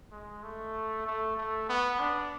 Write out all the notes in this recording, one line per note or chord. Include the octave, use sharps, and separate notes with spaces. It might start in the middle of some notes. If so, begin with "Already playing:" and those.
G#3
A3
A3
A3
B3
D4